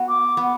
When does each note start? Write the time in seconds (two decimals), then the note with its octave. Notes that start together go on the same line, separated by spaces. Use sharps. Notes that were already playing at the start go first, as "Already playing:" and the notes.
Already playing: B3 F#4
0.09 D6
0.37 B3